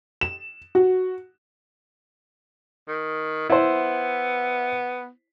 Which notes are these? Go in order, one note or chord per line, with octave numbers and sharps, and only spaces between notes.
E7
F#4
D#3
B3 E4 C5